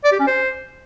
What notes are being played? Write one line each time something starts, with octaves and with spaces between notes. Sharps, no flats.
D5
G4
C#4
C5